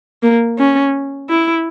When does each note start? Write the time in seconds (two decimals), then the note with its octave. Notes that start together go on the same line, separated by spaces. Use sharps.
0.23 A#3
0.58 C#4
1.29 E4